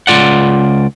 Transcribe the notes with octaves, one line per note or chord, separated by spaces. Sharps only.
C#2 F3 F4 D5 F#5